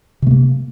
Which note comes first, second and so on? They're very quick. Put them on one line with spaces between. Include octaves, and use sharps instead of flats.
C3 A3 A#3